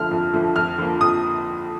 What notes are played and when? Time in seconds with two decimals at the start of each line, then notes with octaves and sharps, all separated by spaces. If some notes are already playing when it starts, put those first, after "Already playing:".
Already playing: F2 D3 F3 A3 F6
0.11 F2
0.33 D3 F3 A3
0.56 F2 F6
0.78 D3 F3 A#3
1.01 F2 D#6